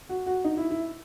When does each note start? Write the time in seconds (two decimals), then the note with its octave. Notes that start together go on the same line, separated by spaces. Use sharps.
0.09 F#4
0.26 F#4
0.44 D#4
0.57 E4
0.71 E4